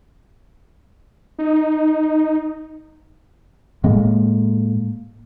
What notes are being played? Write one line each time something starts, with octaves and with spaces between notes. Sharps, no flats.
D#4
A2 G#3 A#3